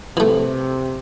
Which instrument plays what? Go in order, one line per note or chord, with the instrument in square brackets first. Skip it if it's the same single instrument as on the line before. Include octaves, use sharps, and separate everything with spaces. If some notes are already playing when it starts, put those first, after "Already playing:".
[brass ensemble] C3 [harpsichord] E3 A3